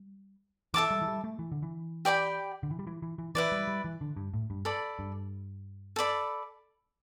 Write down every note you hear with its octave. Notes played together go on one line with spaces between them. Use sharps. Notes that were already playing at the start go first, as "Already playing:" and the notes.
Already playing: G3
E3 A4 E5 A5 D6
G3
E3
G3
A3
E3
D3
E3
G4 D5 G5 B5
D3
E3
G3
E3
E3
E3
E3 E4 B4 D5
G3
G3
E3
D3
G2
A2
G2
A4 D5 B5
G2
A4 D5 B5